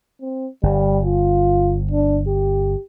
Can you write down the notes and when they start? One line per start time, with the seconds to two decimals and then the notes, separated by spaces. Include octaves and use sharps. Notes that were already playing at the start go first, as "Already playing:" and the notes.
0.21 C4
0.63 G1 G3
1.05 F4
1.91 D4
2.28 G4